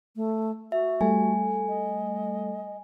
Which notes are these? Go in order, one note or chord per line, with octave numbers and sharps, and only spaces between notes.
A3
F#4 E5
G3 A3 A4 G#5
D#5